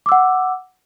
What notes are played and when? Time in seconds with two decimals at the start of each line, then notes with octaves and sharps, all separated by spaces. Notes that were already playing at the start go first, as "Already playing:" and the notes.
0.06 D6
0.09 E6
0.12 F#5